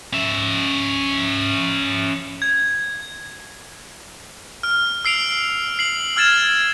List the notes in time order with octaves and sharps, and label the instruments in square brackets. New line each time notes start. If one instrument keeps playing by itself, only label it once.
[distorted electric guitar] C#4 E5
[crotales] G#6
F6
E6 C7 D7 F7
C7 F#7
E6 F6 G#6 A6 E7